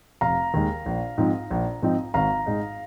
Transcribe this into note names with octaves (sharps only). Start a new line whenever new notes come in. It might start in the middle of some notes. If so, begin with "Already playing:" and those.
F1 F5 A#5
D#2 D#3 G#3
A#1
G#2 F3 C4 D#4
A#1
G#2 F3 C4 D#4
G#1 F5 A#5
G#2 G#3 D#4